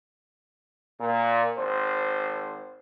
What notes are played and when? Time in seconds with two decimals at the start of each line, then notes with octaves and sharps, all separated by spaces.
1.00 A#2
1.57 G#1 C5